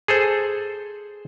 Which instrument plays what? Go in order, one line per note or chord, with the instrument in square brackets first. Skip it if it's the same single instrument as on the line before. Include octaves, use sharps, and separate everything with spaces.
[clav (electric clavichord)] G#4 A4 C5